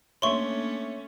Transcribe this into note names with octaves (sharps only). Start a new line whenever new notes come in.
A3 A#3 C#4 D4 C#5 E5 C6 C#6